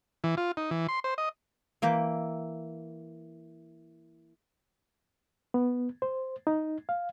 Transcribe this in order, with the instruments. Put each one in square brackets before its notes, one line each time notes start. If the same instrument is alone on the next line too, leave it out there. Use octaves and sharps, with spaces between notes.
[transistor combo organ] E3
F4
D#4
E3
C6
C5
D#5
[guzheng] E3 A#3 E5 G5
[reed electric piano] B3
C5
D#4
F5